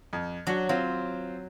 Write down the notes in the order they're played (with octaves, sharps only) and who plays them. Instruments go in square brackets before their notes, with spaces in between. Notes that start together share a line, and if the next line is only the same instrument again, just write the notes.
[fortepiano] F2
[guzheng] F#3 [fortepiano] D4 F#4
[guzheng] F#3 [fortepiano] C4 F4